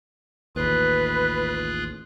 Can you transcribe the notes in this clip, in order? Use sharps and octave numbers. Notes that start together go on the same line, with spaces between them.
A1 D#2 F4 G#4 B4 F#6